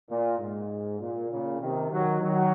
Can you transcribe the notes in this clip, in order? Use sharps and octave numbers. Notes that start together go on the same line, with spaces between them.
A#2
G#2
A#2
A#2 C#3
C3 D#3
D#3 F#3
D#3 F#3